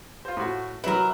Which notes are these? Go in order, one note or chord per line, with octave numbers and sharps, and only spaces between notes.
F4 C5
A2 F#4
F#3 E4 A#4 B4